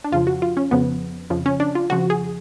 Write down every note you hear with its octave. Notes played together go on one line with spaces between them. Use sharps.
D4
F2 C#3 F3 F4
F#4
F4
C#4
F2 C#3 F3 B3
F2 C#3 F3
C#4
D4
F4
F2 C#3 F3 F#4
G#4